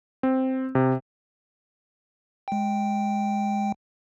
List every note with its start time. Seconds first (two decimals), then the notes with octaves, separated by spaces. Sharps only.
0.23 C4
0.75 C3
2.48 G#3 G5